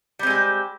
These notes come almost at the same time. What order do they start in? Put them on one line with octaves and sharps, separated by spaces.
G3 C4 G#3 G4